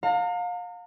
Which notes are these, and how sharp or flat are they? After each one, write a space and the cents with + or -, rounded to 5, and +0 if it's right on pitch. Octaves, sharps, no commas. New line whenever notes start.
F5 +30 A#5 -35